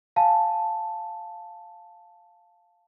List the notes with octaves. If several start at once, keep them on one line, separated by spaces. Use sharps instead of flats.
F5 G#5 A5